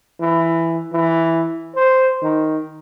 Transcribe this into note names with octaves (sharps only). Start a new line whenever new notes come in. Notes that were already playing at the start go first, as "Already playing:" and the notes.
E3
E3
C5
D#3